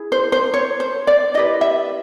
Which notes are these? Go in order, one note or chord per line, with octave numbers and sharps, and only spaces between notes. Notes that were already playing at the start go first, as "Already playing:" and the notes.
Already playing: E4 G#4
C5
C5
C#5
C5
D5
E4 G4 B4 D#5
E5